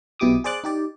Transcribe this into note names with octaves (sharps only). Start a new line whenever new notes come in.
B1 B2 E4 G4 D6 D#6
G#4 C5 D5 D6 F#6
D#4 G4 D5